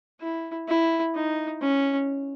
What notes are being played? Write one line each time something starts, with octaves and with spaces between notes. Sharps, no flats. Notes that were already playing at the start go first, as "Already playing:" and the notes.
E4
E4
D#4
C#4